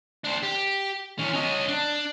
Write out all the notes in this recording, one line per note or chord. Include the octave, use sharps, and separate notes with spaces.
D4 C5
G4
E3 C#4
C#4 D#5
D4